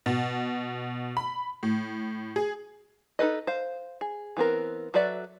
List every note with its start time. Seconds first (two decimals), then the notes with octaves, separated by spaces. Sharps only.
0.06 B2
1.17 B5
1.63 A2
2.36 G#4
3.19 D#4 A4 B4 D#5
3.47 C5 F5
4.01 G#4
4.37 E3 B3 C4 A#4
4.94 F#3 A4 B4 D5 E5